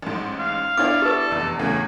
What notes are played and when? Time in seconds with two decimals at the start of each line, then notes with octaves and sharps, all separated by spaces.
0.02 A1 G#2
0.39 F5
0.77 B3 D4 E4 D5 F5 D6
1.02 G4 A4 B4
1.31 F1 E2
1.59 E2 A2 C#3 G#5